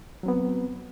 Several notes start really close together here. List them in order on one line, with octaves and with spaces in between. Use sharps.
F#3 C4 B3